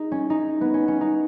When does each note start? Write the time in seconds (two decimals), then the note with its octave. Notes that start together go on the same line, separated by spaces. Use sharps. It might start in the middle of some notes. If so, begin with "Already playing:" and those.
Already playing: D#4 G#4
0.12 C#4
0.30 D#4
0.61 B3
0.74 C#4
0.88 C#4
1.01 D#4